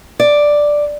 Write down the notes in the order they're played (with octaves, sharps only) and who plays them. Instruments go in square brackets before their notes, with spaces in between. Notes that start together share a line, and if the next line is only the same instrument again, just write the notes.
[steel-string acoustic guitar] D5